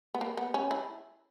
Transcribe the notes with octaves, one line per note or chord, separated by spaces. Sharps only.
B3
A#3
B3
C#4
E4